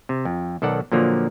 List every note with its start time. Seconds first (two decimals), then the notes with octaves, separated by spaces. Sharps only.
0.09 C3
0.25 F2
0.62 B1 D#3 A4 D5 F#5
0.92 A#2 D3 F3 F#3 A#3